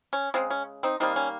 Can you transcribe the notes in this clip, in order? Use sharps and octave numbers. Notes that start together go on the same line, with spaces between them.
C#4
C#3 G#3 C4
C#4
C4 D#4
D#3 G3 A#3 C4 D#4
C#4